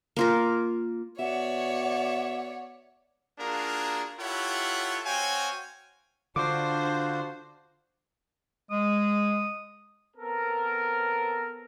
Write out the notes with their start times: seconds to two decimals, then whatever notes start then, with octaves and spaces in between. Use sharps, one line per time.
0.16 A#3 F4 A#4
1.19 B2 C#5 D5 E5 F#5
3.39 A#3 D4 F4 F#4 G#4 A#4
4.20 E4 F4 G4 A4 C#5 F#5
5.06 C4 F#4 C#5 F5 G5 G#5
6.36 D3 D4 F4 F#4 C5 D6
8.71 G#3 D#6
10.17 B3 C4 A4 A#4